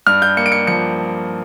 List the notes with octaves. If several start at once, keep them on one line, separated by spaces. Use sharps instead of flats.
G2 F6
G6
A#3 C#7
D7
C#7
F3 C#7